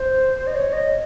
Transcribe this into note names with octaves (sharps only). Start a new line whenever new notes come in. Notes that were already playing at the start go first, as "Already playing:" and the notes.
Already playing: C5
D#5
C#5
D#5